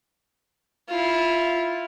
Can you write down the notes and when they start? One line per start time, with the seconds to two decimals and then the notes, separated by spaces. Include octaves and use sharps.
0.89 E4 F4